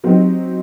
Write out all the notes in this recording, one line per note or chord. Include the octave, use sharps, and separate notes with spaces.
F#3 C4 D#4 G4